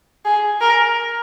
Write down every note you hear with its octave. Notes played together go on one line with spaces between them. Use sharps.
G#4
A#4